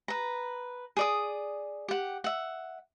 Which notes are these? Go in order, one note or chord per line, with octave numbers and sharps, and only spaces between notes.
B4 A#5
G#4 D5 D#6
G4 F#5
E5 F#5